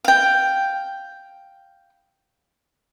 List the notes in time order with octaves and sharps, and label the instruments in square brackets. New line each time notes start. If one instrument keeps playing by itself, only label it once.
[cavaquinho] F5 G5